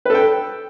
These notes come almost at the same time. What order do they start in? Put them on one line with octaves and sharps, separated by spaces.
B4 A4 G5